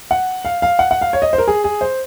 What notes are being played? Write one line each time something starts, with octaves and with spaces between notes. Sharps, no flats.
F#5
F5
F5
F#5
F#5
F5
C#5
D#5
C5
A#4
G#4
G#4
C5